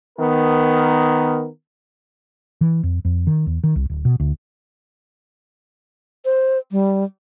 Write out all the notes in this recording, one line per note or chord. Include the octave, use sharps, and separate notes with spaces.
D#3 B3 A#4
E3
F2
F2
D#3
E2
D#3
C2
D1
B2
D2
C5
G3